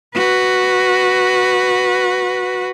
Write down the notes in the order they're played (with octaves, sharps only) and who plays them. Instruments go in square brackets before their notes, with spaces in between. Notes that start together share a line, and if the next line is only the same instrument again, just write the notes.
[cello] F#4 B4